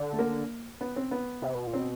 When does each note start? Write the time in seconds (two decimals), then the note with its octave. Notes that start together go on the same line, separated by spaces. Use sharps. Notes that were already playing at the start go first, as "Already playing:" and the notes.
Already playing: D3
0.13 A3
0.19 A#3
0.81 B3
0.96 C4
1.11 B3
1.42 C3
1.55 B2
1.67 A#2
1.73 C4
1.79 B2